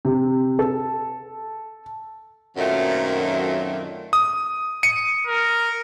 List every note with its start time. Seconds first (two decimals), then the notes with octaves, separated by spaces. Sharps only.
0.05 C3
0.59 A4
2.57 F#2 A#2 D#3 F#3 A3 C4
4.13 D#6
4.83 C#7 D#7
5.27 A#4